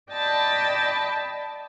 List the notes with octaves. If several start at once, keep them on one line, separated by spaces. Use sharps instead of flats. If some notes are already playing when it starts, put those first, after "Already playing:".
D5 D#5 G5 A5 B5